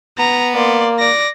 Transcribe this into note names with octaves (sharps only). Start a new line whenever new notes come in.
B3 A#5
A#3 D5 C6
D5 A#6